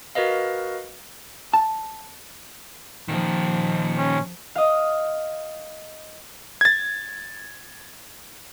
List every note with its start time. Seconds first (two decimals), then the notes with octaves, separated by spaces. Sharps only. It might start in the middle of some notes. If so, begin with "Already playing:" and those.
0.15 F#4 A#4 B4 D#5 F5
1.53 A5
3.08 A#2 D#3 F3
3.97 C#4
4.55 D#5 F5
6.61 G#6 A6